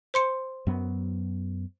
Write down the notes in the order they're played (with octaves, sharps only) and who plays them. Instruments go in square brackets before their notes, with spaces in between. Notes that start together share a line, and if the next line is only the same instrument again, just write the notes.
[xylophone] C5 C6 C#7
[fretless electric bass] F#2 F#3 B3